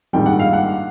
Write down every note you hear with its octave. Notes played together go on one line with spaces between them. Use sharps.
A#1 G#2 D#3 G3 G5
F#5
F5
F#5